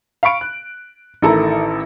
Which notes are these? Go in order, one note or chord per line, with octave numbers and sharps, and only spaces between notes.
F5 B5 C#6 D7
F#6
A1 D#3 E4 A4 A#4 A#5